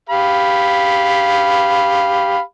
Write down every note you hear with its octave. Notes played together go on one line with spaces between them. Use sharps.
G4 F5 B5